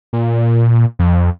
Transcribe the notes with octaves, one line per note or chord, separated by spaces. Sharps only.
A#2
F2